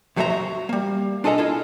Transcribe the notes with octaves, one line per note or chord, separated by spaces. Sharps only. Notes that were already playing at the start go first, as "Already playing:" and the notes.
F2 F#3 A3 C5 E5 A#5
F#4
G3 A#3
D4 F4 G#4 A4 D#5 A#5
E4 F4 A4